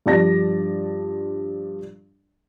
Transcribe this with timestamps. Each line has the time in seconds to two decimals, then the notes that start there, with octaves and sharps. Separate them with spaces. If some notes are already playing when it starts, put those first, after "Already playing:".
0.06 G2 F3 D4 D5 A5 A#6